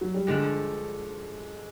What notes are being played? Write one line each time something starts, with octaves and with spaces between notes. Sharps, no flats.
F#3
G3
G2 D3 F3 G#3